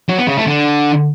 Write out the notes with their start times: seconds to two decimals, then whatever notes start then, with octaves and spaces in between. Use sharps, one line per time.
0.08 F#3
0.18 B3
0.28 C#3
0.37 A3
0.47 D3